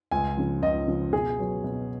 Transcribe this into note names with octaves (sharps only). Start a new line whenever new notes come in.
C#2 G#5
C#3 F3
C#2 D#5
C#3 F3
B2 G#4
F#3 B3
B2